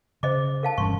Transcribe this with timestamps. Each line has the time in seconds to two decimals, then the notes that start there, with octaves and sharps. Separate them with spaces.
0.23 C#3 C5 D#5 D6
0.63 A#4 F5 A5
0.78 E1 G2 C#4 C6 C#6